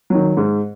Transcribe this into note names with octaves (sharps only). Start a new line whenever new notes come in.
D#3 F#3
G#2